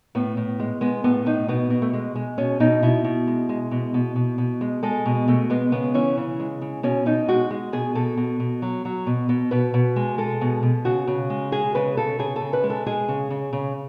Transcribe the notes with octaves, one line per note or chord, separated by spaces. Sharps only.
A2 B3
A2
G#3
G#3 B3
A2 B3
A2 D#4
B2 B3
B2
A3
G#3
G#3
B2 C#4
B2 D#4
B2 E4
B2
G#3
G#3
B2
B2
B2
B2
G#3
G#3 A4
B2
B2 A3
G#3 B3
C#3 B3
E3 C#4
C#3
G#3
C#3
B2 C#4
B2 D#4
G#3 F#4
G#3
B2 G#4
B2 A4
B2
B2
F#3
F#3
B2
B2
B2 B4
B2
G#3
G#3 A4
B2
B2
C#3 F#4
C#3
G#3
G#3 G#4
C#3 B4
C#3 A4
C#3 G#4
A4
C#3
B4
G#3
A4
G#3 G#4
C#3
C#3
C#3